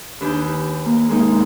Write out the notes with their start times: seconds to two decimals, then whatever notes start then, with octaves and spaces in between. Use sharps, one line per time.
0.21 D#2 D4 B4 G#5 G6
0.85 A#3
1.09 G#3 A#3 D#4